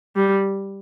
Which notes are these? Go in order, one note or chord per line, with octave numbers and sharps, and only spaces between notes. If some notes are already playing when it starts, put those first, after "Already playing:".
G3